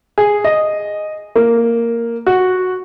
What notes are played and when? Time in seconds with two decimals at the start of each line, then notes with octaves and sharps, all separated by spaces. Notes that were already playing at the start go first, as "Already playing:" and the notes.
0.18 G#4
0.44 D#5
1.36 A#3
2.26 F#4